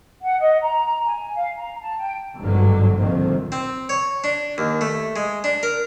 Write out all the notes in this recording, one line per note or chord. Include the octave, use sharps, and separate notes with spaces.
F#5
D#5
A#5
G#5
F5
A#5
A5
G5
G#1 G2 B2 D3 F#3
C2 A#2 D3 D#3 F3 C4
C4
C#5
D4
D#2
A3
G#3
D4
A#4